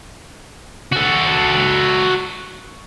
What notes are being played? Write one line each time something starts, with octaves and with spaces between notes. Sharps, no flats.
F#4 A4